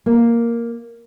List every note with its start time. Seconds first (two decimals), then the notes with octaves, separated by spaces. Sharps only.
0.06 A#3